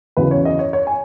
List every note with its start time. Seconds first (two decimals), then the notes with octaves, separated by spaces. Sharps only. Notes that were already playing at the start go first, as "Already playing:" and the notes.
0.17 E2 C#3 F#3 B4
0.31 C#5
0.45 D#5
0.59 C#5
0.73 C#5
0.87 G#5